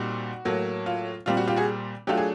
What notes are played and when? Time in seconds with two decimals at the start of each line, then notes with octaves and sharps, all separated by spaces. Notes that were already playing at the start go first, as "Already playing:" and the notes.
Already playing: A#2 G3 C4 D#4 F#4
0.45 A2 F#3 A#3
0.86 F4
1.26 A#2 G3 C4 F4
1.37 F#4
1.48 F4 G4
1.56 F#4 G#4
2.07 F#3 A3 D4 F4 G4
2.17 G#4